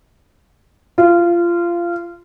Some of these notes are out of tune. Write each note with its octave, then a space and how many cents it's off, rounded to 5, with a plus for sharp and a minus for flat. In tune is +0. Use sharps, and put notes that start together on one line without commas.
F4 -20